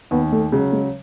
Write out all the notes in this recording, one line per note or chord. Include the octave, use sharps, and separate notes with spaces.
D#2 B3
A3
C#3 F#3 G#3
G#3